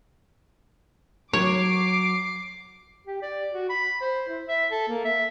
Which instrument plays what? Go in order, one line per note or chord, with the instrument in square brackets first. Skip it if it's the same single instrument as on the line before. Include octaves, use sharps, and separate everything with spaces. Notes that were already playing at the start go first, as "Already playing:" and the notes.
[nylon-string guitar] F#3 [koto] C#5 [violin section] D6 C7
[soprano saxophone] G4
D5
F#4
B5
C5
E4
E5
A4
A#3
E5